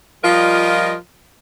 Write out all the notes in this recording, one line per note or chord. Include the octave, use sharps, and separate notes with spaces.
F3 G3 F4 A#4 D#5